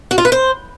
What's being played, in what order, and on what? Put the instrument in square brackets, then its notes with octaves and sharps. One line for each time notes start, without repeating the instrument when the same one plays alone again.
[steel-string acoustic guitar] F#4
F4
B4
C5